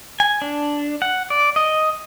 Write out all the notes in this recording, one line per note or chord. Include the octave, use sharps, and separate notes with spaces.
G#5
D4
F#5
D5
D#5